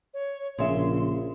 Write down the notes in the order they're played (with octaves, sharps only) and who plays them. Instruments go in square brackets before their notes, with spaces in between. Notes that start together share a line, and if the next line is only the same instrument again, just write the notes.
[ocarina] C#5
[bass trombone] A#1 [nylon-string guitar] C#3 E5 [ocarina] C6